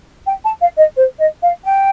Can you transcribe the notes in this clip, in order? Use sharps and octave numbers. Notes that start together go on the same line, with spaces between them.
G5
A5
F5
D#5
C5
D#5
F5
G5